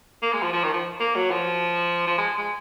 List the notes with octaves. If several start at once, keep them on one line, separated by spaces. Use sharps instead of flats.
A#3
G#3
F3
F3
D#3
F3
A#3
F#3
F3
F3
G#3
G#3